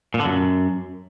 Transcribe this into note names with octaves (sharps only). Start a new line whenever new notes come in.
A#2
D3
F#2